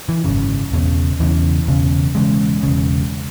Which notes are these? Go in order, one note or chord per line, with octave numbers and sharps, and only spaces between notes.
E3
G#1 F#2 C#3
E1 E2 C#3
E1 E2 C#3 E3
E1 E2 C#3
E1 E2 C#3 G#3
E1 D#2 C#3